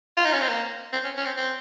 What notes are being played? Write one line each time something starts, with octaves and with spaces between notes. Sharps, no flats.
F4
D#4
C#4
C4
A#3
C4
C#4
C#4
C4
C4